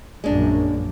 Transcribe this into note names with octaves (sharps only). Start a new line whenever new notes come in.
A#1 F#2 G#3 A#3 D4